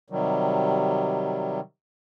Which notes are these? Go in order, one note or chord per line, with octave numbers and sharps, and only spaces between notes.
C3 D#3 F#3 G3